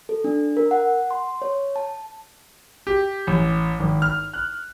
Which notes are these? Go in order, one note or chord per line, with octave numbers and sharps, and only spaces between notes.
A4
D4
A#4
F#5
C6
C#5
A5
G4
A1
G#1
F6
F#6